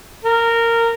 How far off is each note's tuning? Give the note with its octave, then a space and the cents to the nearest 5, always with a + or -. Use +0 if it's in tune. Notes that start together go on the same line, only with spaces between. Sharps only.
A#4 -15